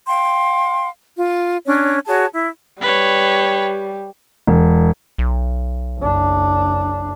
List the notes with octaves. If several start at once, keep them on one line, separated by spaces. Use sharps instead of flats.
F5 G5 C6
F4
C#4 D4 C#5
F#4 G#4 C#5 A5
E4
G3 B4 C#5
E1
B1
F#1 D4